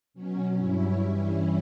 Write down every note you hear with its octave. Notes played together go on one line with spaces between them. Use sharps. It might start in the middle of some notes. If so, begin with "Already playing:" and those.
B2 F#3 C#4
G2 F#3 C#4 E4
G2 E3 G3